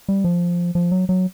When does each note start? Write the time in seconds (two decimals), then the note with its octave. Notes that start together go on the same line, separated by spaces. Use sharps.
0.08 G3
0.24 F3
0.75 F3
0.92 F#3
1.09 F#3